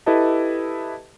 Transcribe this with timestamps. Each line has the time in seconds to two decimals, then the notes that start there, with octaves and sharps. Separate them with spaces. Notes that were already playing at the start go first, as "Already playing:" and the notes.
0.06 E4 G4 A4 B4 D#5 A5